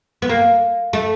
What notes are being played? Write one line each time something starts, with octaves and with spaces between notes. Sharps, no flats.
B3
A#3
A3